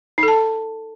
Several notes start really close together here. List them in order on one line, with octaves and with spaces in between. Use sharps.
D#4 A4 A5